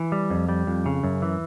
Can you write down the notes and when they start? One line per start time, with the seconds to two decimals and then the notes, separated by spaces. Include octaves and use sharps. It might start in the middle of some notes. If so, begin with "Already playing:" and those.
Already playing: E3
0.12 G3
0.30 F2
0.49 G3
0.67 F2
0.86 C#3
1.04 F#2
1.22 E3